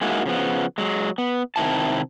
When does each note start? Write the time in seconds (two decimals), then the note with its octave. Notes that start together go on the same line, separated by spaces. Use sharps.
0.01 G#3 A#3 D#4 E4 F#4
0.26 C#3 F3 B3
0.78 F#3 G#3
1.18 B3
1.56 C3 D#3 E4 A5